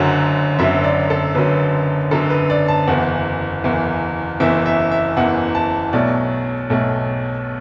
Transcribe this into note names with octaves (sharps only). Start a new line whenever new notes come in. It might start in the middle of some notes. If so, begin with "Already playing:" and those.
Already playing: F#1 F#2 D3 F#3 F#5
F#1 F#2 D3 F#3 E5
D5
A4
F#1 F#2 D3 F#3 B4
F#1 F#2 D3 F#3 A4
B4
D5
A5
F#1 E2 E3 F#5
F#1 E2 E3
F#1 E2 E3 E5
E5
E5
F#1 E2 E3 F#5
A5
B1 B2 F#3 A3 D5
B1 B2 F#3 A3